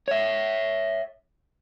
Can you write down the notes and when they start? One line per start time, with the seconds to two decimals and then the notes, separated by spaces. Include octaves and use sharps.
0.08 C#5 E5